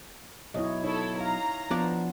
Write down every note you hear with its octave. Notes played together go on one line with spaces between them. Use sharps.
B1 E4 C#5 D#5
D#4 E4 A4 C#5
F5 A#5
F3 B3 D4 D5